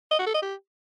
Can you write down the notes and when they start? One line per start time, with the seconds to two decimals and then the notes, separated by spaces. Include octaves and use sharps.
0.11 D#5
0.19 F#4
0.27 A4
0.34 D#5
0.42 G4